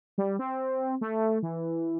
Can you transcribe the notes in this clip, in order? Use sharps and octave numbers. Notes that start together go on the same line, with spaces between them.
G3
C4
A3
E3